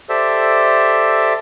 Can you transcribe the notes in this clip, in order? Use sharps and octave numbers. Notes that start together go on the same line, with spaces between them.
G4 A4 C5 D5 E5